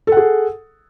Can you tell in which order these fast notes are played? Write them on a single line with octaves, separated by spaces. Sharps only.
A4 F#5 G#4